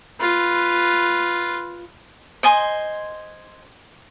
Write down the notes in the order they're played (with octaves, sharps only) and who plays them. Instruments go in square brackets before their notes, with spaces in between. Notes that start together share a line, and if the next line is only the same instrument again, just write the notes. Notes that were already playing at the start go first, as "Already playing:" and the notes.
[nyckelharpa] F4 B4
[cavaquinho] C5 D#5 G#5 C6